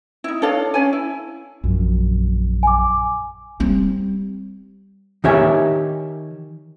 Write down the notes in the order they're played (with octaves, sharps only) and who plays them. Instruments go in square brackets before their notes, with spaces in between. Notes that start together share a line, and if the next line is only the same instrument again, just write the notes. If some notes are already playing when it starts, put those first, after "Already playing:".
[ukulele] D#4 E4
D4 A4 C#5 F5
C#4 C#5 G#5
E4
[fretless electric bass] A#1 F#2
[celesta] G#5 D6
[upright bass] G3 C4
[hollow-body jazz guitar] D#3 D#4 G4 C#5 E5 G#5